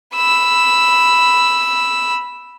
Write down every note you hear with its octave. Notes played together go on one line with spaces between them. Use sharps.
B5 E6